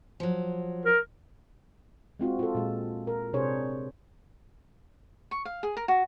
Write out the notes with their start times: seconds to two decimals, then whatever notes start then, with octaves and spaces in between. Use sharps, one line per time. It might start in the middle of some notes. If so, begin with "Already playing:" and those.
0.20 F3 F#3
0.86 A#4
2.19 G#3 C4 F4 F#4
2.39 F4 A4
2.55 A#2 G#3
3.07 A#4
3.33 C3 D4 G#4 C5 C#5
5.31 C#6
5.45 F5
5.63 G#4
5.77 A#4
5.88 F#4